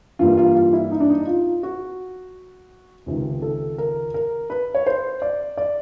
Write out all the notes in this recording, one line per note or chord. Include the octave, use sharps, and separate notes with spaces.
G2 E3 G3 A#3 F4
F4
F4
E4
D#4
D4
D#4
F4
F#4
C#2 C3 D#3
A4
A#4
A#4
B4
C#5
C5
D5
D5